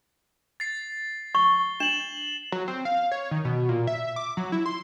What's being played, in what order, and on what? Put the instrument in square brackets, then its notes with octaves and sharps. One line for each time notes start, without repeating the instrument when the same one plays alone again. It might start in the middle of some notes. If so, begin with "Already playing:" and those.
[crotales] A6 C7
[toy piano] C#6 [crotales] G7
[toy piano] D4 [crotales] E7 F#7
[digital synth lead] F#3
C4
F5
C#5
D#3
B2
A#2
E5
D6
F#3
E4
C6